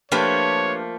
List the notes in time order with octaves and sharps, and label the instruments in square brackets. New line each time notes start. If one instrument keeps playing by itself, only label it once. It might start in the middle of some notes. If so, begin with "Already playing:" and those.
[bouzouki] F3 A3 A#3 [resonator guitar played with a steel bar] D4 G4 B4 [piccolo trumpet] C#5